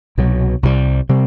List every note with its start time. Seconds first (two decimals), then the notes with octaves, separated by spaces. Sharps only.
0.18 C2 B2 F#3
0.63 C2 C3 E3 G3
1.09 C3 G3 C4